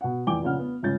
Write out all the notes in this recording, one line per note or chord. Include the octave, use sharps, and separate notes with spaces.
B2 F#5
F1 E2 G5 G#5 D6 G7
A#1 F2 C#3 F#5 F6
B3
G1 C#2 C#3 G6 A6